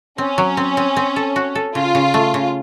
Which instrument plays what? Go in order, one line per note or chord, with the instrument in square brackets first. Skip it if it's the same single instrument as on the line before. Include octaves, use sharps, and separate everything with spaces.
[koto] C4 [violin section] C#4
[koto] F#3
C4
C4
C4
A4
F#4
A4
[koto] C#3 [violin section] F4
[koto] C#3
A3
C#3